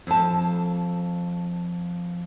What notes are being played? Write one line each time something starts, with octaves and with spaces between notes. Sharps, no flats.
F2 A5